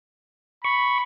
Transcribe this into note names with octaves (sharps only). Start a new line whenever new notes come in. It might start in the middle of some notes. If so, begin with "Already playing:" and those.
B5 C#6